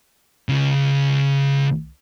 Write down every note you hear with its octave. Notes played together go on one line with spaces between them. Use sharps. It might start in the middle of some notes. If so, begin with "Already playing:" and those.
C#2 C#3